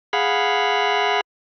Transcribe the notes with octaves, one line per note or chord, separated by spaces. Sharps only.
G#4 F5 F#5 B5